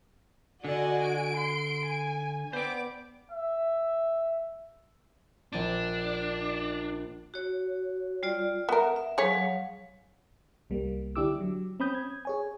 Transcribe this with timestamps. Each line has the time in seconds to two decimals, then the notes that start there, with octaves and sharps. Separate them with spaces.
0.64 D3 F#4 D5 D#5 F#5 G#5
1.03 D7
1.37 C6
1.86 G#5
2.53 B3 C5 D5 G5 D6
3.31 E5
5.52 A#1 D4 A6 D#7
7.34 F#4 C#5
8.23 G3 F4 D5
8.69 B3 A#4 E5
8.96 E5
9.18 F#3 G#4 C#5 F5
10.70 C2 G3 A#3
11.16 D3 D4 E4 G4 D6 E6
11.40 F#3
11.80 C4 C#4 B5 D#6 G6
11.95 G#6
12.25 G#4 C#5 G#5